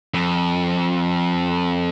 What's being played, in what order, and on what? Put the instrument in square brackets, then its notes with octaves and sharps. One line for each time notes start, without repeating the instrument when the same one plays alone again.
[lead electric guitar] F2